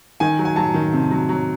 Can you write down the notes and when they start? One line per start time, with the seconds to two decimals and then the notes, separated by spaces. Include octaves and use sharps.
0.20 D#3 G#5
0.39 F#3
0.45 G#5
0.56 F#3 A5
0.74 D#3
0.93 C3
1.11 F#3
1.29 F#3